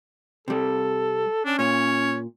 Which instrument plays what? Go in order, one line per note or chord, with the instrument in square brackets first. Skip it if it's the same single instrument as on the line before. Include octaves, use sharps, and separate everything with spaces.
[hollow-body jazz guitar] C3 G3 [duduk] A4
[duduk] C#4 [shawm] D4
[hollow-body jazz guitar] A#2 [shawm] C#5